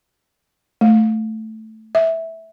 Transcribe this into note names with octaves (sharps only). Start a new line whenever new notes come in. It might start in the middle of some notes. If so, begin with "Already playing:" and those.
A3
E5